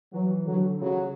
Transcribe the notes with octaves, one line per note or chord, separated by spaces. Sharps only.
E3 F#3
D3 F#3
D3
C#3 F#3